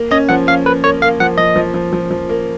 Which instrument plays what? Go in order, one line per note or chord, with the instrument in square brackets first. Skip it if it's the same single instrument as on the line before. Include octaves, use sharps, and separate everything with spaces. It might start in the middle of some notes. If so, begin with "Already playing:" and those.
Already playing: [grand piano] A#3
[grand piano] C#4 [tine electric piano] D#5
[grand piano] F3 [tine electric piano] F#5
[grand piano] C#4 [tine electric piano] F5
[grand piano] A#3 [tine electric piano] B4
[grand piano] A#3 [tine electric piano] C#5
[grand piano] A#3 [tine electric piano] F5
[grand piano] F3 [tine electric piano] F#5
[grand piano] F3 [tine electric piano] D#5
[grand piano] F3
F3
F3
F3
A#3